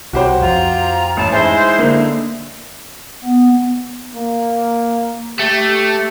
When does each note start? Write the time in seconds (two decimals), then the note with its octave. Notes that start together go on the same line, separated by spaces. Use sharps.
0.13 C2 F#4 G4 C5
0.42 F2 F4 A#5
1.17 A1 A5
1.32 G#3 D#4 E4 C5 G#5
1.79 D3 A#3
3.25 B3
4.15 A#3
5.39 A3 G4